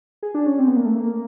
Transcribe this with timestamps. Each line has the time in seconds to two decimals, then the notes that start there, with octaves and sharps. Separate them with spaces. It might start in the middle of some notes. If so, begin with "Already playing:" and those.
0.23 G#4
0.35 D4
0.46 C#4
0.59 C4
0.68 B3
0.76 A#3
0.85 A3
0.95 A#3